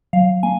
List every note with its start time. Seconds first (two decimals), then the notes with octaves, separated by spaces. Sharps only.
0.13 F#3 F5
0.43 A#3 G#5